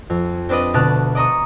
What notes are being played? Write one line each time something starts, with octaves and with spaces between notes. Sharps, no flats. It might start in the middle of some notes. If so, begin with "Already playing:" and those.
F2
C4 D4 B4 D5 D#5
D2 B2 D5 A5 F6 F#6
D5 D#5 A#5 C#6 D#6